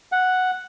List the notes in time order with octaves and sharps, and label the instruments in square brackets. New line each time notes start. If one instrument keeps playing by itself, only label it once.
[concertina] F#5